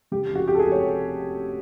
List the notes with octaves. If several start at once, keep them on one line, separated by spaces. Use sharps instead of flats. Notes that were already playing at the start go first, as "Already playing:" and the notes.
C#3 G4
F1
F#4
F1 G4
A4
G#4
F1
C#5